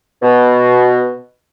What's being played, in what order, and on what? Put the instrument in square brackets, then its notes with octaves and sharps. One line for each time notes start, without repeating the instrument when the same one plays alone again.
[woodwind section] B2